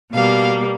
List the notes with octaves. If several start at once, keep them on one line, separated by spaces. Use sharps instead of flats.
B2 G3 A#3 F5